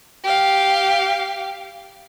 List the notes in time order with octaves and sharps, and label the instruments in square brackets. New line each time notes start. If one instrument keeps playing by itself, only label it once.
[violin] G4 F5